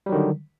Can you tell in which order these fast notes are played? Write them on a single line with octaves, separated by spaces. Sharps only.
G3 F#3 D#3 D3